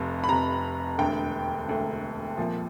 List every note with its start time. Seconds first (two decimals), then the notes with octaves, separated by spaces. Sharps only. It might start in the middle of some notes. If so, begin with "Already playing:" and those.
Already playing: F1 F2 C3
0.24 B5
0.29 F1 F2 C3 A#5
0.98 E1 D2 D3 G5
1.67 E1 D2 D3
2.37 C2 A#2 F3